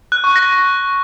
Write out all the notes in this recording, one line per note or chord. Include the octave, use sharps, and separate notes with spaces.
F#6
C#6
A#6